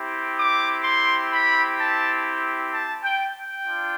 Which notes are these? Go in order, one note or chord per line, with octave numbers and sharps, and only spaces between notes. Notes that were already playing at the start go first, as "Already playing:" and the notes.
Already playing: C4 E4 G4
D6
C6
B5
A5
A5
G5
G5
D4 F4